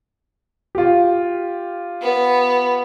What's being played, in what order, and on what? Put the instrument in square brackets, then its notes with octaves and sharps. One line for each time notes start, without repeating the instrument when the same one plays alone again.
[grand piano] F4 G4
[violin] B3